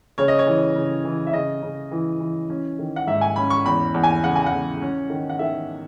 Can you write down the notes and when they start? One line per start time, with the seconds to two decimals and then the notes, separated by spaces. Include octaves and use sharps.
0.18 C#3 C#5
0.28 D#5
0.39 C#5
0.47 E3
0.76 C#3
1.05 E3
1.27 E5
1.33 C#3 D#5
1.63 C#3
1.91 E3
2.20 E3
2.50 C#4
2.79 D#3
2.96 F#5
3.07 G#2 E5
3.21 G#5
3.36 C#4 B5
3.50 C#6
3.65 E2 B5
3.94 E2
4.03 G#5
4.23 C#3 F#5
4.36 G#5
4.46 F#5
4.52 E2
4.81 C#4
5.10 D#3
5.30 F#5
5.39 D#3 E5